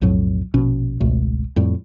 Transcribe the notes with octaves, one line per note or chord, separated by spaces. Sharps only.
B1 F2 A2 F#3
A#1 B2 C#4
G#1 C#2 B2 A3
F2 A2 G3